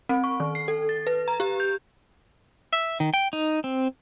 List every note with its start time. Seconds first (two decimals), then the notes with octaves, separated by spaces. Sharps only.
0.09 C4
0.24 C#6
0.40 D#3
0.55 C7
0.68 A4
0.89 A6
1.07 B4
1.28 A#5
1.40 G4
1.60 G6
2.73 E5
3.00 D#3
3.14 G5
3.33 D#4
3.64 C4